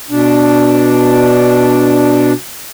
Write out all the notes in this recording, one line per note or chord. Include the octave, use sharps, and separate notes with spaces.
B2 D4